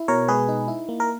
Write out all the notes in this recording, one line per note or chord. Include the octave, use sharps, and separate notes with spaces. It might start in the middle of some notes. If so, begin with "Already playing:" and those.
Already playing: E4
B2 A#4 C#5
G#3 G#4 B4
D#4
E4
A#3
A#4